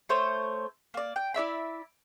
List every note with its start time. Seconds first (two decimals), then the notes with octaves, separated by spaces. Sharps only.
0.09 A3 C5 C#5
0.94 A#3 D5
1.16 G5
1.34 E4 D5 E5 B5